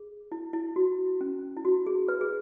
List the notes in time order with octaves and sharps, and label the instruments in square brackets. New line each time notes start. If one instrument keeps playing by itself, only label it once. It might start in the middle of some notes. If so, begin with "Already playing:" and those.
Already playing: [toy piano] G#4
E4
E4
F#4
C#4
E4
F#4
G#4
B4
G#4